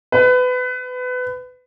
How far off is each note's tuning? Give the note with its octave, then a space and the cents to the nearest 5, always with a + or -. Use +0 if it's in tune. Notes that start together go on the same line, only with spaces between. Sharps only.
B4 +25